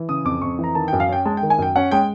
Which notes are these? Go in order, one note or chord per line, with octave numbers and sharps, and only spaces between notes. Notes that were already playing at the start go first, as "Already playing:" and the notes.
Already playing: E3
C#3 D#6
F2 D6
F2 C#6
E3 A#5
D#3 A5
G5
F#2
F5
C#4 G5
G#3 A5
G5
D#3
G#5
F#2 G5
C#4 F#5
G#3 G5